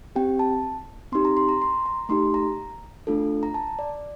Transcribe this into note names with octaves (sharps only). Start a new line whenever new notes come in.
C4 G4 G5
A5
C4 D#4 G4 C6
A#5
C6
A#5
C6
A#5
A3 D#4 G4 C6
A#5
A3 D4 F4 A4
A#5
A5
D5